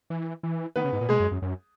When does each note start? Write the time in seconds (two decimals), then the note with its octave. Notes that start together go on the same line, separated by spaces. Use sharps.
0.10 E3
0.43 E3
0.76 D#3 B3 B4
0.85 C#3
0.93 G#2
1.01 A#2
1.09 B2 G#3 G#4
1.20 F#2
1.31 F#2
1.42 F#2